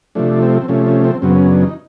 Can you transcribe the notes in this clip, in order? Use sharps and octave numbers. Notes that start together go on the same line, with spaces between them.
C3 F3 A3 D4
C4
C3 F3 A3 C#4
C#4
C4
F#2 C#3 F#3 B3 C4
C#4
D4
D#4